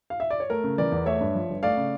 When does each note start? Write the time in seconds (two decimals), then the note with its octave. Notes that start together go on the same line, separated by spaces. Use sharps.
0.10 F5
0.20 E5
0.30 D5
0.40 C#5
0.50 A3 A#4
0.64 C#3
0.78 E3 A#4 D5
0.92 E2
1.06 A3 C#5 E5
1.21 G2
1.35 F3
1.49 G1
1.63 A3 D5 F5
1.77 C#3